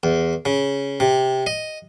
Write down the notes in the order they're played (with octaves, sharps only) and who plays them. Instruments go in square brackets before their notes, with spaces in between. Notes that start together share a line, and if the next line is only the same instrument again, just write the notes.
[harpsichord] E2
C#3
C3
D#5